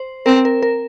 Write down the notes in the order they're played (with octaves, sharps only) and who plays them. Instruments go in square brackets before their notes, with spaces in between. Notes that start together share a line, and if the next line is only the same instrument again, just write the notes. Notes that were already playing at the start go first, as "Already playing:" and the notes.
Already playing: [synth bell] C5
[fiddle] C4 [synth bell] A#4
[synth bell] A#4
A#4